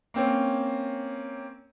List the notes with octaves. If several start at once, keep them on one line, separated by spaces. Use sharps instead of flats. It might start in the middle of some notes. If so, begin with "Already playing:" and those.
A#3 C4 C#4